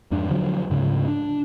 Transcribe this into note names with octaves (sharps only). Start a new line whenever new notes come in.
F2 G#2 D4
D3 F3 F#3
D2 G#2 C#3
D4